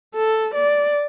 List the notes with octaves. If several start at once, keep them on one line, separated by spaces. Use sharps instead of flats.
A4
D5